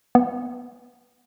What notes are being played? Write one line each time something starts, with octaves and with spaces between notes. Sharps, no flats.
B3